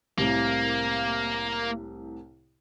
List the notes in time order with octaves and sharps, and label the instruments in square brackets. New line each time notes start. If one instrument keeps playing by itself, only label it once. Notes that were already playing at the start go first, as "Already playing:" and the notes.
[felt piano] C2 A2 C3 [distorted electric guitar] A#3